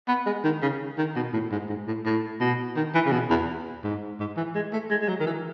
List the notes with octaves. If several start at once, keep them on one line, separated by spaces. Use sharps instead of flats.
B3
G#3
D#3
C#3
D#3
B2
A2
G#2
G#2
A2
A2
B2
D#3
E3
C#3
B2
E2
G#2
G#2
E3
G#3
A3
G#3
G#3
F#3
D#3
E3